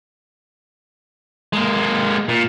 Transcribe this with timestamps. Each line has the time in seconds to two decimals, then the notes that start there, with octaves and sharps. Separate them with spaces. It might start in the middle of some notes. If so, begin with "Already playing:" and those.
1.53 G#3 A#3
2.29 A#2